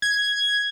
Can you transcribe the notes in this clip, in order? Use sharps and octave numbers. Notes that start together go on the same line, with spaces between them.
G#6